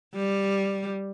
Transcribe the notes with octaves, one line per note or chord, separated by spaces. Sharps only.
G3